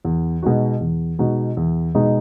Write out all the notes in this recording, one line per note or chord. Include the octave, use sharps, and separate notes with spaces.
E2
B2 G#3 D#4 F#4
E2
B2 G#3 D#4 F#4
E2
B2 G#3 D#4 F#4